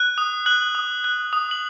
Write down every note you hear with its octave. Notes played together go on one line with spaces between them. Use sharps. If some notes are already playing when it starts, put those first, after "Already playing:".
Already playing: F#6
D#6
F#6 F#7
D#6
F#6
D#6
F#7